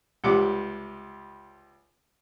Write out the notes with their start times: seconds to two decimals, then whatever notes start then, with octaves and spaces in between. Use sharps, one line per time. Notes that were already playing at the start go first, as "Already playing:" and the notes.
0.24 C#2 C3 G3 F#5 D6